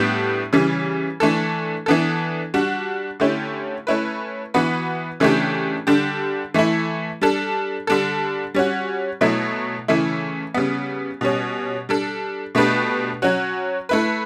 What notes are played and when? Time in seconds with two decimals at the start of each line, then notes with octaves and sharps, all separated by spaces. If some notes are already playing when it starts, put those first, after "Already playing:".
Already playing: A2 G3 B3 D4 G4
0.53 C#3 E3 G3
1.20 E3 A3 D4 A4
1.86 E3 B3 D4 A4
2.54 G3 D4 F#4
3.20 D3 A3 C#4 E4 G4
3.87 A3 C#4 E4 B4
4.54 E3 B3 F#4 B4
5.20 C#3 E3 A3 D4 G4
5.87 D3 G3 D4 G4
6.54 E3 A3 E4
7.22 G3 D4 A4
7.87 D3 G3 D4 A4
8.54 G3 C#4 F#4
9.21 B2 F#3 A3 E4
9.88 C#3 E3 A3 E4
10.54 C#3 G3 B3
11.21 B2 G3 C#4
11.89 G3 D4 A4
12.55 B2 A3 D4 G4 B4
13.22 F#3 C#4 F#4
13.89 A3 E4 B4